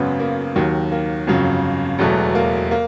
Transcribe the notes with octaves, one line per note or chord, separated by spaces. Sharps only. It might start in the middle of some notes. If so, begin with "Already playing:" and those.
Already playing: G#1 F#2 C#3 B3
A#3
D#2 D#3 F#3
A#3
G1 F2 C#3 F#3
E1 E2 B2 F#3 A3
A#3
A#3